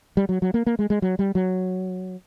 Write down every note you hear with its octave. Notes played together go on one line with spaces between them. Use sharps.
G3
F#3
F#3
A#3
A#3
G#3
G#3
F#3
G3
F#3